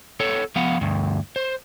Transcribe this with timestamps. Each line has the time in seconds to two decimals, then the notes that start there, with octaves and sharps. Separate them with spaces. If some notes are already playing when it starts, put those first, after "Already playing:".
0.20 B3 A4 C#5
0.56 F3 B3 F5 F#5
0.81 D2 G2
1.36 C5